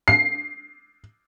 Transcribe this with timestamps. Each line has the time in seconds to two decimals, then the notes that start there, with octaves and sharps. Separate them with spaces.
0.08 C7